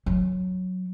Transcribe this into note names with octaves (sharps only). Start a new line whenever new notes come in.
F#3